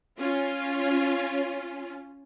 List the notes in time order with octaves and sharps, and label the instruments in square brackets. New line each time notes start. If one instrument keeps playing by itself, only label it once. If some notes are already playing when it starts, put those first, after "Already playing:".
[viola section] C#4 F4